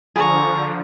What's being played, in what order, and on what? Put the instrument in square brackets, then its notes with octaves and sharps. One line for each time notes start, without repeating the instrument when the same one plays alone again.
[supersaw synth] D3 F3 [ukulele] G#4 [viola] A#5 C#6